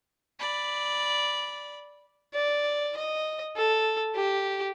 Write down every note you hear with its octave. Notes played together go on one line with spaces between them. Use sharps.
D5 B5
D5
D#5
A4
G4